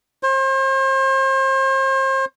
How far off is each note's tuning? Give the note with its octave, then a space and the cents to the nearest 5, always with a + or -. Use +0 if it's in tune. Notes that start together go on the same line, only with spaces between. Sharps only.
C5 +40